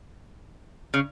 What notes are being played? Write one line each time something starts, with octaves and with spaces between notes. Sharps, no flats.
C#3